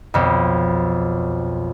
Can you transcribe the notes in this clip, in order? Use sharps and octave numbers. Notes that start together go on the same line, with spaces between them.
B1 F2